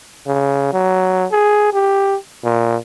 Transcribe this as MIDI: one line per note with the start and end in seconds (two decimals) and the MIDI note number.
0.26 0.71 49
0.73 1.25 54
1.32 1.72 68
1.73 2.15 67
2.44 2.76 46